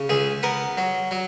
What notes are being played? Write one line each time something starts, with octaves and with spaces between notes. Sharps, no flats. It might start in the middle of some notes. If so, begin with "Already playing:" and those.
Already playing: C#3
C#2 G#4
B3 A#4
F#3
F#3